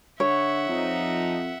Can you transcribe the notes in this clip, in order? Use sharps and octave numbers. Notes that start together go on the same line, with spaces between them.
D3 C#5 E5 F#5
F2 F3 D#4